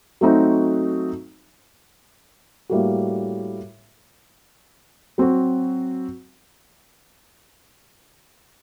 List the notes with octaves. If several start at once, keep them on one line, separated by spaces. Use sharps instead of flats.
F#3 A3 C4 D#4 F#4
A2 G3 A#3 F#4
F#3 C4 F#4